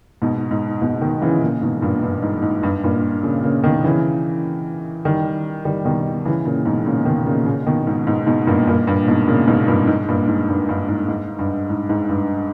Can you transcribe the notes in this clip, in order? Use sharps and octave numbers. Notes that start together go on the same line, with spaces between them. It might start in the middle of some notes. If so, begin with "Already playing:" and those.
G#2 B2
G#2
G#2 B2
B2 D#3
C#3 E3
A#2 C#3
G#2 B2
G2 A#2
G2
G#2
G#2
G2
G2 A#2
A#2 C#3
A#2 C#3
B2 D#3
C#3 E3
D#3 G3
D#3 G3
B2 D#3
C#3 E3
A#2 C#3
G#2 B2
A#2 C#3
B2 D#3
A#2 C#3
A#2 C#3
B2 D#3
G#2
G#2 B2
G#2 B2
G2 A#2
G2 A#2
G2 A#2
G#2 B2
A#2 C#3
G#2 B2
G2 A#2
G#2
G2 A#2
G#2
G2
G2
G#2
G#2
G2
G#2
G#2
G2